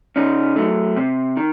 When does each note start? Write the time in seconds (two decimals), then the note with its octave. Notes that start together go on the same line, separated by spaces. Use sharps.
0.16 C#3 C#4 D#4
0.56 F#3 A3
0.96 C3
1.37 D#3